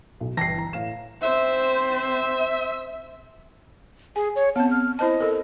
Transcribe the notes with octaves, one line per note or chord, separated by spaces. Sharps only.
B1
G1 E3 G5 A5 A#6 C7
A#5
A2 F5 E7
C4 C5 E5
G#4 G#5
C#5
B3 C4 A5
F6
E4 C5 D#5 A5
A4 A#4